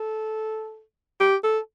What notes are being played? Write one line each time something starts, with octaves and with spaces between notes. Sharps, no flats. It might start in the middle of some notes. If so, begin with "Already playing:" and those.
Already playing: A4
G4
A4